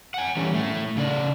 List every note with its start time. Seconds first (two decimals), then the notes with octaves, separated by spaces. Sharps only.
0.14 F#5 G#5
0.36 E3 G3 C#4
0.54 A2 A3
0.97 C#3 C#4 D5